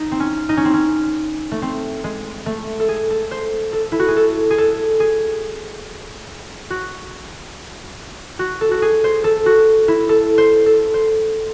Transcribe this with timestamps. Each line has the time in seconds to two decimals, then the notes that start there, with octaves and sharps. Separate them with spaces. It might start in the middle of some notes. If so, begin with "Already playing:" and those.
Already playing: D#4
0.11 C4
0.20 C#4
0.49 D#4
0.57 C#4
0.65 C4
0.74 C#4
1.51 A3
1.62 C4
2.04 G#3
2.46 A3
2.80 A4
2.89 G#4
3.10 A4
3.31 C5
3.73 A4
3.92 E4
3.99 F#4
4.08 G#4
4.16 A4
4.50 G#4
4.58 A4
5.00 G#4
6.70 F#4
8.39 F#4
8.61 A4
8.71 F#4
8.82 G#4
9.04 C5
9.24 A4
9.46 F#4
9.88 E4
10.09 A4
10.38 C5
10.66 A4
10.94 C5